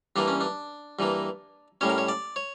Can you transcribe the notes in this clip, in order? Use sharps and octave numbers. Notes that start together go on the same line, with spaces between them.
G2 E3 A#3 D4
C#4
D4
G2 E3 A#3
A2 G3 C#4 C#5
A#4
C#5
D5
C#5